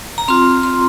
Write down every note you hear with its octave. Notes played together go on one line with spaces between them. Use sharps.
A#5
C4 F4 C6
C6